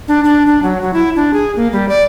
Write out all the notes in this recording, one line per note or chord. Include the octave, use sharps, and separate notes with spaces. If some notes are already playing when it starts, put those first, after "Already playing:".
D4
D4
D4
F#3
F#3
E4
D4
G#4
A#3
G3
D5